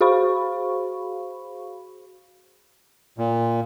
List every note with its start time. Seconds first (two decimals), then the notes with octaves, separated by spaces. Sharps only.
0.01 F#4 G#4 C5 F5 B5 C#6
3.18 A#2